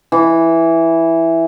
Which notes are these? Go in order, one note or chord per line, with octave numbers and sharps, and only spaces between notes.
E3